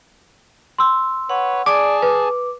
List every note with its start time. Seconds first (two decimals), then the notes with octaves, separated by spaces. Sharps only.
0.78 C6 E6
1.30 B4 C#5 F#5
1.66 G#4 D5 G#5 A5 D6
2.02 B4 D6